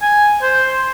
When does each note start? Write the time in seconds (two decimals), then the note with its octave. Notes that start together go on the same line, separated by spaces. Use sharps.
0.02 G#5
0.42 C5